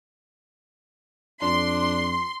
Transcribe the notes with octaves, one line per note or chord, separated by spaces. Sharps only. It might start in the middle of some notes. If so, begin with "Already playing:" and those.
F2 D4 C6